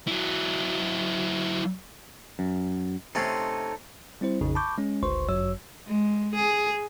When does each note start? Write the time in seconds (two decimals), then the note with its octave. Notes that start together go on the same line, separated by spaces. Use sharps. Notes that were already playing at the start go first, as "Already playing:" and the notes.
0.08 F#3 E4
2.39 F#2
3.15 C3 A3 C#4 D#4 A4 C6
4.21 G3 C4 E4 C5
4.41 A#1 F2 C#3 D#4
4.55 A5 B5 C#6 D6 G6
4.78 G#3 C#4
5.03 G1 C#2 C5 C6 C#6
5.29 G1 F#2 F#3 F#4 C#5 E6
5.87 G#3
6.35 G#4